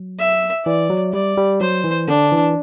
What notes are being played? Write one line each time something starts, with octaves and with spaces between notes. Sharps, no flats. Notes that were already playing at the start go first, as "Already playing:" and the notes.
Already playing: F#3
E5
E3 D5
F#3
G3 D5
G3
F#3 C5
E3
D3 D4
E3